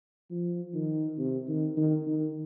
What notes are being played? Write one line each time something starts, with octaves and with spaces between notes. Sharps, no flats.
F3
D#3
C3
D#3
D#3
D#3